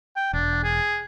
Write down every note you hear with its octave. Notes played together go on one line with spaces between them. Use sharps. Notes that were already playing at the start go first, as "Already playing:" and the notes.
G5
E1 D4
G#4